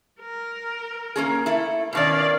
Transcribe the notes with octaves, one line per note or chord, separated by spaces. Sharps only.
A#4
A#3 C#4 G#4
A3 E4
B2 D#3 C#4 D5 F5